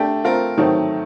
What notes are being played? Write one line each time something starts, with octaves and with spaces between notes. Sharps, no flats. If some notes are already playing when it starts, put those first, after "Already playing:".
Already playing: A3 D4 G4
A3 C4 F4 A#4
D#3 F#3 A3 C4 D#4